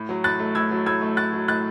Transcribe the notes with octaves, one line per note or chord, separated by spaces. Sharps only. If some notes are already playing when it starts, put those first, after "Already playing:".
Already playing: A2
F#3
A2 F#6 A6
A3
A2 E6 G#6
F#3
A2 E6 G#6
A3
A2 F#6 A6
F#3
A2 F#6 A6